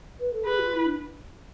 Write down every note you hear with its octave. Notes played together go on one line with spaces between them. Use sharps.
B4
A4
G#4 B4
F4
E4
D4